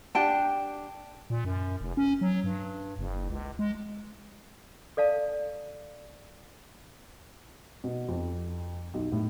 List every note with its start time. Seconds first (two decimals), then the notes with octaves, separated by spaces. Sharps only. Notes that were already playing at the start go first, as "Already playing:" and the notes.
0.15 D4 G4 G5 A5
1.30 A#2
1.45 F#2
1.81 F1
1.97 C#4
2.21 F#3
2.44 G2
2.99 F#1
3.30 C#2
3.59 G#3
4.97 A4 D5 F5 A5
7.84 B2
8.08 F2
8.94 B1
9.12 A2